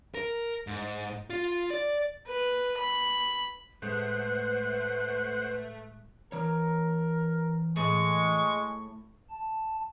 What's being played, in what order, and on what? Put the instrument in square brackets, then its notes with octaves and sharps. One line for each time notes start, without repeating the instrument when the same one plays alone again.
[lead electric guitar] A#4
G#2
F4
D5
[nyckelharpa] B4
B5
[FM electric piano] A2 G#3 F#6 [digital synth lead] A3 [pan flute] B4 [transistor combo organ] C5 F#5
[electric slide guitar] E3 C#5 [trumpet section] A#4
[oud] A2 G#4 [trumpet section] G#3 [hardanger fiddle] C#6
[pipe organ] A5